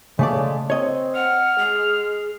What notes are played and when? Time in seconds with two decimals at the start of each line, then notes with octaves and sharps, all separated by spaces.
0.19 C#3 G#3 A3 D5
0.70 C4 C#5 D#5
1.15 F#5 F6
1.58 G#3 G#4